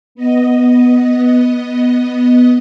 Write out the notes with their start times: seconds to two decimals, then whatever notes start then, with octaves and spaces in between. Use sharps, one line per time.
0.15 B3 D#5